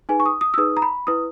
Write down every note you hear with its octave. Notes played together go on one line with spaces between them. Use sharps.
D#4 G#4 B4 G#5
C#6
D#6
D#6
E6
D#4 G#4 B4 D#6
A#5
B5
E4 B4 D#6